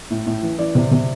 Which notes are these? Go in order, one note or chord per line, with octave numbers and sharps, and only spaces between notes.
A2
A2
E3
E3 D5
C3
C3